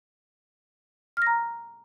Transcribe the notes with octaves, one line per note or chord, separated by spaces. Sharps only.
A#5 F6 A#6